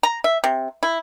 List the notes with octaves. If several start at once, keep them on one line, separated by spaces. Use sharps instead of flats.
A#5
E5
C3
E4